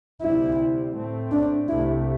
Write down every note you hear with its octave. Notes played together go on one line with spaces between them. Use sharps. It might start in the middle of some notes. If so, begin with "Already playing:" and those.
D2 C3 G3 C4 E4
A2 A3 C4
D4
C2 C3 A3 E4